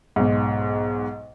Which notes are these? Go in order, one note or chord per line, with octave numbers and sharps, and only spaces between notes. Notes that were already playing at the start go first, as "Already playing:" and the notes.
B1 G#2